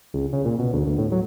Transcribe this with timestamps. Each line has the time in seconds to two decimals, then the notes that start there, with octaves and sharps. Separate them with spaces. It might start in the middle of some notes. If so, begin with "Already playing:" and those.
0.14 C#2
0.33 C#3
0.45 A#2
0.59 B2
0.73 D2
0.86 D2
0.98 A2
1.12 F#3